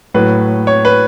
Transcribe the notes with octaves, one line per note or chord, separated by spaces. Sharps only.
A2 F#3 B4
C#5
B4